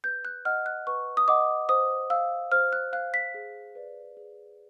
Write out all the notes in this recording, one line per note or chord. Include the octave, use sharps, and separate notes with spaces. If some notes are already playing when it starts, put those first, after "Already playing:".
B4 G6
F#6
D#5 F#5 F6
F#6
B4 C#6
D#6
D#5 F#5 D6
C5 D#6
F5 E6
C5 F6
F#6
F5 F#6
B6
G#4
B4 D5
G#4